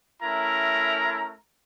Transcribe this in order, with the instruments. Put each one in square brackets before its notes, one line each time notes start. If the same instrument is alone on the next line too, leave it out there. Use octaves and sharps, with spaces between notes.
[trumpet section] A3 C#4 E4 A#4 A#5